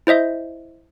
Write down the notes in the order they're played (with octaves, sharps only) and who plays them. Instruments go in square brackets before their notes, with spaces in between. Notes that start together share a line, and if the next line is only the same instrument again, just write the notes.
[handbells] E4 C5 D#5 E5 G6